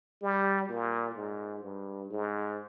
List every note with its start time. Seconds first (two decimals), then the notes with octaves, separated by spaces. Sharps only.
0.22 G3
0.69 A#2
1.15 G#2
1.63 G2
2.10 G#2